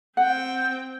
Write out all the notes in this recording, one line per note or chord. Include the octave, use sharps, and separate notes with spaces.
C4 F#5 G5